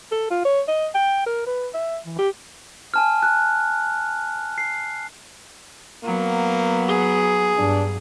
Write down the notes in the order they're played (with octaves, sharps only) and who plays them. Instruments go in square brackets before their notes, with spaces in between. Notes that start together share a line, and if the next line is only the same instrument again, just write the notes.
[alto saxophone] A4
F4
C#5
D#5
G5
A#4
B4
E5
E3
G4
[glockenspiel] G#5 A5 F6
F#6
C7
[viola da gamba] F#3 B3 [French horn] A#3
[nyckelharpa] G#4
[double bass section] G2 [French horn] D4